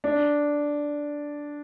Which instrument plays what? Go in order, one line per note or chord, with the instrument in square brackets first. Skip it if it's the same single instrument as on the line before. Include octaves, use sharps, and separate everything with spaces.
[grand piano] D4